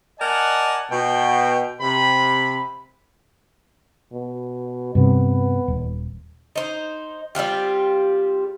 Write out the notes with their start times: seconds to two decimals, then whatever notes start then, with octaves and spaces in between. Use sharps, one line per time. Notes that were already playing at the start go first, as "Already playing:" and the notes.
0.19 A#4 D5 D#5 F#5 G#5 A5
0.91 B2 G5
1.81 C3 B5
4.13 B2
4.95 G2 C3 B3
5.68 D#1
6.55 D#4 C5
7.35 G3 C4 F4 G4